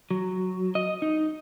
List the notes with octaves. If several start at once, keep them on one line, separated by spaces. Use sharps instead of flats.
F#3
D#5
D#4